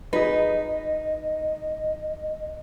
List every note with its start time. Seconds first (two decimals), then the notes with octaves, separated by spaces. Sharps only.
0.13 D#4 G#4 B4 D#5